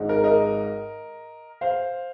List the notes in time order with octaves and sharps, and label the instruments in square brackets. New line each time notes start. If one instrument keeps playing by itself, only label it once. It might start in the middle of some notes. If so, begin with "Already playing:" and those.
Already playing: [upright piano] G#1 G#2 G#3 D#4
A#4
A#4 D#5
C5 F5